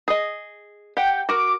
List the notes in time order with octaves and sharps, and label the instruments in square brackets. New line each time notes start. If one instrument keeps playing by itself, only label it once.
[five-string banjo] G#4 D#5
[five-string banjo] G4 F#5 [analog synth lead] G5
[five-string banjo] F#4 A#4 [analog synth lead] D6